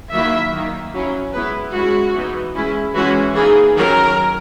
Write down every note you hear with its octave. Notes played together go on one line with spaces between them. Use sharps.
D#3 F#3 A#3 E4 E5
D#3 A#3 D#4
F#3 C#4 E4
G#3 B3 E4 B4
G#3 C#4 E4 F#4
E3 B3 D#4
G#3 C#4 E4
E3 G#3 C#4 E4 F#4
E3 A#3 D#4 G#4
D#3 F#3 C#4 A#4